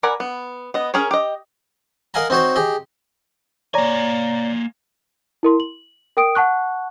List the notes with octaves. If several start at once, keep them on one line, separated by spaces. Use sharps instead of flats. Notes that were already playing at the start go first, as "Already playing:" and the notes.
A#4 D5 F#5 G#5 B5
B3
B3 D#5
C#4 G#4 A#4 C#5
G4 D#5
A#4 D#5 F5 F#5 G#5 A#5
C4 D#4 F#4 C5 C#5
G4 G#4 D#5
A#3 C#5 D5 G#5 A#5
E4 A#4 C6
F#7
A#4 G5 D#6 D7
F#5 A5 C#6 F#6